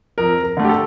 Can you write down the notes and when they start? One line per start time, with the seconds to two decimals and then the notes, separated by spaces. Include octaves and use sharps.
0.18 F2 A#4
0.43 A#4
0.57 D3 A3
0.65 G4
0.69 A4